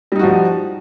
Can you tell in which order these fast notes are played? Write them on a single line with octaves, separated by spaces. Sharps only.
G3 D#4 F#4 F3